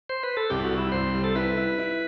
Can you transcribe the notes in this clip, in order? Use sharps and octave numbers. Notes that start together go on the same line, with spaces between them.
C5
B4
A4
C2 G4
F#4
G3
E4
C2 C5
G3
A4
E4 B4
E4
E4